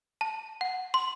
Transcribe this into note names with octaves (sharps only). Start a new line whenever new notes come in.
A5
F#5
C6